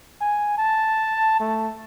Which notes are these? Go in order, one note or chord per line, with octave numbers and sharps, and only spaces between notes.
G#5
A5
A3